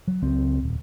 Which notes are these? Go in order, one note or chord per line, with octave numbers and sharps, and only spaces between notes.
F#3
C#2 F#3 C4
D#1